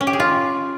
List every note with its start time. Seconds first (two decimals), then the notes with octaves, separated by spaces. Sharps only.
0.01 C#4
0.07 G4
0.13 G#4
0.20 F4